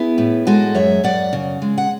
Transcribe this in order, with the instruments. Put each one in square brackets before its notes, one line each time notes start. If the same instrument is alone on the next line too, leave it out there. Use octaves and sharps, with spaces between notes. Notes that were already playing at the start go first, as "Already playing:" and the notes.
Already playing: [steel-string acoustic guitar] B3 E4 G#4
A2
G#3 F#4 A4
F#2 C#5 E5
F#2 D5 F#5
C#3
G#3
F#5